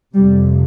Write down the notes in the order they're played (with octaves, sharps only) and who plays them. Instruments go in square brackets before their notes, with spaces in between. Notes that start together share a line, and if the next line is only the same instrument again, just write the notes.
[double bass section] F2 C3 G3